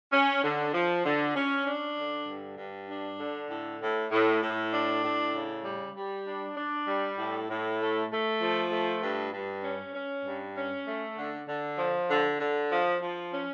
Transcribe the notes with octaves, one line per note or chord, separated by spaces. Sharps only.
C#4
D3
F3
D3
C#4
D4
D3
G2
G2
D4
D3
A2
A2
A2
A2
D4
A2
C#3
G3
G3
D4
D4
G3
A2
A2
A3
A3
F3
A3
G2
G2
C#4
C#4
G2
C#4
A3
D3
D3
F3
D3
D3
F3
F3
C#4